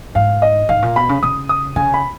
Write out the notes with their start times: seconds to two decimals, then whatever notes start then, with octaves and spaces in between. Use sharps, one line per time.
0.15 G#2 F5
0.42 D#5
0.69 G#2 F5
0.82 A#2
0.96 B2 B5
1.09 C#3
1.23 C#3 D#6
1.49 D#6
1.76 C#3 G#5
1.94 B5